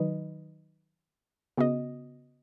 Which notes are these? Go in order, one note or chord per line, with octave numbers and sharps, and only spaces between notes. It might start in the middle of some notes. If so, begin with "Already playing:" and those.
Already playing: D#3 F#3 D#4 B4 D#5
C#3 B3 F#4 D#5